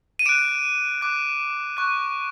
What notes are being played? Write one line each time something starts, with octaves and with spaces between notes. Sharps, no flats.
D#7
D6 F#6 D7 E7
D6 F#6
C#6 F#6